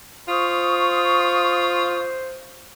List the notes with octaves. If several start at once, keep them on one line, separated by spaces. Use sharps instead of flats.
F4 C5 C#6 D#6